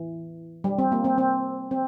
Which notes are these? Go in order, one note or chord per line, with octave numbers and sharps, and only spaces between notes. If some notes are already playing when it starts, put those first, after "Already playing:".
Already playing: E3
G3
C4
A#3
C4
C4
C4